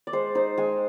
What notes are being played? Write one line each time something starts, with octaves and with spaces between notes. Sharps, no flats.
D5
G#3 C5
D#4 C5
G#3 G#5